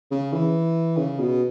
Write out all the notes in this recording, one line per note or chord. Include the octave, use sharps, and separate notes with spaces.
C#3
E3
C#3
B2